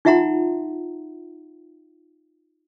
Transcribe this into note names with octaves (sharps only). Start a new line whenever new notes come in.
D#4 F4 E5 F#5 A#5 C6